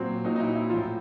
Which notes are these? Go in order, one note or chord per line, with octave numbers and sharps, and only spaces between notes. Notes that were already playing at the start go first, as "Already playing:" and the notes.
Already playing: A#2 F#3 C4
A#2 F#3 D#4
D#4
E4
E4
F3 F4
A2